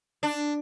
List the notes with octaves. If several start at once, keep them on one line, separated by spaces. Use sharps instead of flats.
D4